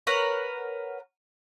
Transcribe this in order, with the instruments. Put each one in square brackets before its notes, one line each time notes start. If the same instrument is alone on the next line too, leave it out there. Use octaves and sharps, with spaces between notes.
[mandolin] A#4 B4 C#5 F#5